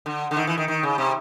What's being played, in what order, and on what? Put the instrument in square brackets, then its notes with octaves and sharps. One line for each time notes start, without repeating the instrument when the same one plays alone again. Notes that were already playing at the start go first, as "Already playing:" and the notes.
[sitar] D3
D3
D#3
E3
D#3
D#3
C#3
C3